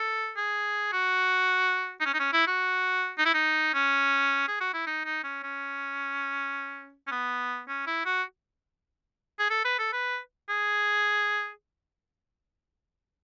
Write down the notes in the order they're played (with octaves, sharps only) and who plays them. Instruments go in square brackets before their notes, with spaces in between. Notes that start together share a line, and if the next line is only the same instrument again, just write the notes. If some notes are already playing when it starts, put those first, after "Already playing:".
Already playing: [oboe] A4
G#4
F#4
D#4
C#4
D#4
C#4
E4
F#4
D#4
E4
D#4
C#4
G#4
F#4
E4
D#4
D#4
C#4
C#4
C#4
B3
C#4
E4
F#4
G#4
A4
B4
A4
B4
G#4